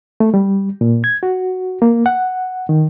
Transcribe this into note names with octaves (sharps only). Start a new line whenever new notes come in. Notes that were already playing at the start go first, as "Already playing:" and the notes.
A3
G3
A#2
G#6
F#4
A#3
F#5
D#3